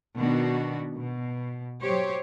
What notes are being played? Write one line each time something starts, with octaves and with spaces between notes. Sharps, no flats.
B2 D#3 B3 D4 F#4
B2
F#3 G4 C5 C#5